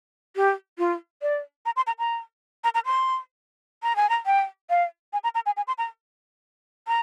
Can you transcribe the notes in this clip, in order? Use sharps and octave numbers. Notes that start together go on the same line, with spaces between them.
G4
F4
D5
A#5
C6
A#5
A#5
A#5
A#5
C6
A#5
G#5
A#5
G5
F5
G#5
A#5
A#5
G#5
G#5
C6
A#5
A#5